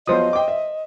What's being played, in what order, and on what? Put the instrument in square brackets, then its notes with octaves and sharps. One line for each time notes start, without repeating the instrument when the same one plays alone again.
[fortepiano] E2 F3 F#3 [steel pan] B4 C5 D#6 [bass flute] D#5
[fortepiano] G5 D6
E5